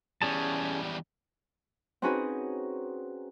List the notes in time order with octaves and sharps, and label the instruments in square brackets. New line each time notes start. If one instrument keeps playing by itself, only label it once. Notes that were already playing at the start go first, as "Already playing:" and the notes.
[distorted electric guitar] E2 G3 [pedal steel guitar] C#4 G#4 A5
[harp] C4 C#4 D#4 F#4 G#4 B4